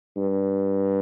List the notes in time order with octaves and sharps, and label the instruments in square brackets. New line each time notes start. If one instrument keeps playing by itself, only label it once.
[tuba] G2